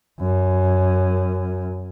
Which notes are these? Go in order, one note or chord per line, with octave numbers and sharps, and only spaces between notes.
F#2